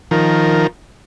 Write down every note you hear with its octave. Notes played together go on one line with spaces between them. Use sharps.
D#3 F3 A#4